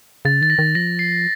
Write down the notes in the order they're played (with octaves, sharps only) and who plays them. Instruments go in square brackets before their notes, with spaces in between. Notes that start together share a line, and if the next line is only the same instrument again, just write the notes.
[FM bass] C#3 [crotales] A6
[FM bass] D#3 [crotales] A6
[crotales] A#6
[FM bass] D#3
[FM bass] F3 [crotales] A#6
[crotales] C7